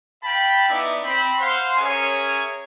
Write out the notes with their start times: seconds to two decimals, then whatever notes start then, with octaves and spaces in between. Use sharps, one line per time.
0.24 F5 G5 A5 B5
0.69 B3 D#4 E4 D5 E5
1.04 C4 B5
1.39 C5 F5 F#5 C6
1.78 C#4 G#4 A#4 C#5 E5 G#5